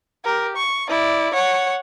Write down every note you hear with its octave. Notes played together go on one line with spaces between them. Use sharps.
G4 A#4
C#6
E4 D5
C#5 F#5